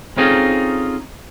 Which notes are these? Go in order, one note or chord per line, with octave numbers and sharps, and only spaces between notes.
C4 C#4 D#4 F4 G#4 A4